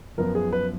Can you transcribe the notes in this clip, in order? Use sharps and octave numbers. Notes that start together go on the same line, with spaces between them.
F#2 F3 B3 A#4
G#4
B4